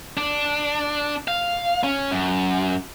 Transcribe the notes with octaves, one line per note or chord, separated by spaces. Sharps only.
D4
F5
C#4
F#2